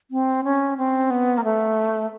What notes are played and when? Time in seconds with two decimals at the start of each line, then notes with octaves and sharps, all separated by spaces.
0.11 C4
0.44 C#4
0.77 C4
1.11 B3
1.38 A#3
1.44 A3